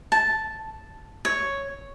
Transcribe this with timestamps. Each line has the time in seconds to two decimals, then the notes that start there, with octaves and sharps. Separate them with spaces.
0.12 A5
1.25 C#5